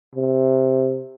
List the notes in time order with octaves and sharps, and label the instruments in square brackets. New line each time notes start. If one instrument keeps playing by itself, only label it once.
[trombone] C3